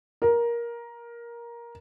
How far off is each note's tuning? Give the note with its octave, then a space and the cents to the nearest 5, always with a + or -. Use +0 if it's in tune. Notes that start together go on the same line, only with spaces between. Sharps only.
A#4 +15